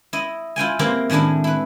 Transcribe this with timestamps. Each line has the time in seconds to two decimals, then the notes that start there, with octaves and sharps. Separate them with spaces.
0.13 E4 D#5
0.56 E4 F4 G5 G#5
0.79 A#3 C4 E4 G4 A#4 C5
1.10 A2 D#3 G#3 D4 E4
1.44 E4 B4